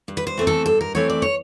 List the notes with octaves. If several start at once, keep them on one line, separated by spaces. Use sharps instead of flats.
G2
B4
C5
E3 A3 C4
A4
G2 A4
A#4
E3 A3 C4 C#5
D5
C#5